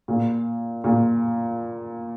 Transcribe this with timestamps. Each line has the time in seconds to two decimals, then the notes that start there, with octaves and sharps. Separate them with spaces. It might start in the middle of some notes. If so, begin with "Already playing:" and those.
0.08 A#2
0.84 A#2